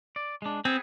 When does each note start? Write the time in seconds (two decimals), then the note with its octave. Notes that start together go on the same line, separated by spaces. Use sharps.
0.16 D5
0.42 G#3 D4
0.65 B3 C4 G#4 G#5